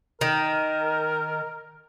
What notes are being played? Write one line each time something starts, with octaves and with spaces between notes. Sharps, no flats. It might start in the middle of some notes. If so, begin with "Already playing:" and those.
D#3 A#4